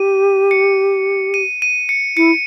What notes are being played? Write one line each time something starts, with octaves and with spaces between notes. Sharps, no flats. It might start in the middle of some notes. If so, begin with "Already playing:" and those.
Already playing: G4 D#7
C#7
D#7
D#7
C#7
E4 C#7